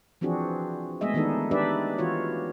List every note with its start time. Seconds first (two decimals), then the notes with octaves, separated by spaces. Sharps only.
0.21 E3 F3 C4 D4 F#4 G#4
1.01 G#3 A3 B3 G#4 D#5 E5
1.14 D#3 E3 B3 D4 D#4 A4
1.51 D4 D#4 G4 B4 D5 E5
1.98 E3 F4 F#4 C#5